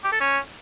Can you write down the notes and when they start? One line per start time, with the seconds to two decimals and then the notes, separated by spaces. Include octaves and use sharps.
0.04 G4
0.12 A4
0.20 C#4